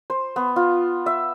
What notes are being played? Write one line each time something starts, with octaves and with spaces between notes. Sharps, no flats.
C5
B3
F4
E5